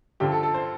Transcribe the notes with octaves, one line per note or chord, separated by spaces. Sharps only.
G2 D3 F3 G4
A4
A4
C5